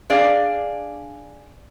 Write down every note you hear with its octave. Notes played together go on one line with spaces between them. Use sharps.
D4 G#4 D5 F5